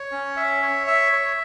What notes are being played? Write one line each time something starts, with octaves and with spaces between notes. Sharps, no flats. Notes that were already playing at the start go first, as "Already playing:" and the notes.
Already playing: C#5
C#4
E5
C#5
E5
C#5